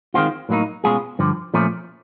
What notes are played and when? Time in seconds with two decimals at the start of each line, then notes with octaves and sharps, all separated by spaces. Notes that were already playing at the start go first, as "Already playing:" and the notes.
0.14 D#3 G#3 C4 F4
0.49 A2 F#3 A#3 D#4
0.84 B2 G#3 C#4 F4 G#4
1.19 G2 D3 F3
1.54 A#2 F3 A3 C#4